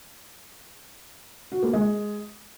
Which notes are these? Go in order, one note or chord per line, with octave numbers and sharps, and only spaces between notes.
F#4
A#3
G#3